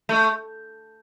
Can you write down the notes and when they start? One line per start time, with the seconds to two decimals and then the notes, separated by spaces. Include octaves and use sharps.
0.09 A3